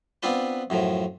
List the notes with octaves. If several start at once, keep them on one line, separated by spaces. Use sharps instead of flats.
B3 C4 D4 F4 B4
F#2 A2 F3